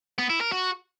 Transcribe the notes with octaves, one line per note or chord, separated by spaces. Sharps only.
B3
E4
A#4
F#4